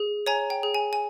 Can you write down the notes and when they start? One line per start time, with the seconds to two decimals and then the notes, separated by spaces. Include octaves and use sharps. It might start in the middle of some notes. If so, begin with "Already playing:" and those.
Already playing: G#4
0.26 C#5 G#5 A#5
0.50 G5
0.63 G#4
0.74 G#5
0.93 G#5